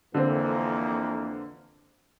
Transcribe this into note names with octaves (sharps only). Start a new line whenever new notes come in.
F2 D3 E3 A#3 C4